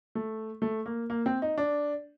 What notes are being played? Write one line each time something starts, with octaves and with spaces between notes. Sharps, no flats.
A3
A3
A#3
A#3
C4
D#4
D4